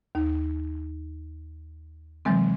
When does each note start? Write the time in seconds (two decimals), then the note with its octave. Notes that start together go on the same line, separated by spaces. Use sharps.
0.15 D#2 D#4
2.25 C3 E3 F#3 G#3 C4